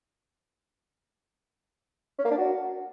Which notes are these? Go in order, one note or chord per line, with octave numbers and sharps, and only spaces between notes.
C#4
A#3
D4
F#4